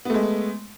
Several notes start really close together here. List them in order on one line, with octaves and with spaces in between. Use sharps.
B3 A3 G#3